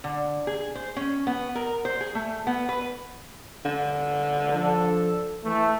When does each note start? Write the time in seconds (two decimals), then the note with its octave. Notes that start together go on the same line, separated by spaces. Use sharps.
0.04 D3
0.47 G#4
0.75 C5
0.96 C#4
1.27 B3
1.55 A#4
1.85 C5
2.01 G#4
2.15 A3
2.47 B3
2.69 B4
3.65 D3
4.52 F3 D4 A4
5.44 E3 A3